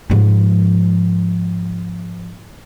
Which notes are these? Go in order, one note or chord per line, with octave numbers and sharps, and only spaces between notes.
G#2 F3